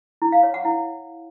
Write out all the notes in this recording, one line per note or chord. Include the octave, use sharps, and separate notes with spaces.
E4
F5
C#5
F#5
E4